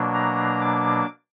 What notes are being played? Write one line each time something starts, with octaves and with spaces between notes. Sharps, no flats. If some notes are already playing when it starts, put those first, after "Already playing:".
Already playing: B2 F#3 A#3 D4
A#5
D6